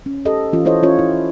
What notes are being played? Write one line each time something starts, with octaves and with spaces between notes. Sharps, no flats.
C#4
G4 A4 D#5
E3 C#4 F4
E4 A4 C5 C#5 D#5
C#4 F4 C#5
E4